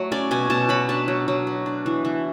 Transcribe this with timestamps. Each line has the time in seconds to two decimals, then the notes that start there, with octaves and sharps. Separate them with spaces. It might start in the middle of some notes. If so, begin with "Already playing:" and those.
Already playing: F#3 A3
0.12 C#4 D5
0.31 B2 G#5
0.50 B2 A5
0.69 F#3 B5
0.89 D4 A5
1.08 F#3
1.28 F#3
1.47 B3
1.66 D4
1.86 E3
2.05 E3